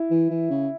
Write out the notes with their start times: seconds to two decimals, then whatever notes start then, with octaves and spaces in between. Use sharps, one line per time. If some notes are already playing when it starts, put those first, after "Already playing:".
Already playing: E4
0.10 E3
0.30 E3
0.50 C#3